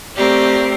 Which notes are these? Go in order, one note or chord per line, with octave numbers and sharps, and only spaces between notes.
A3 C4 G4 A#4 D5